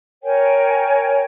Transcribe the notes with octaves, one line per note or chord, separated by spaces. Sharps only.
A#4 C#5 G5 G#5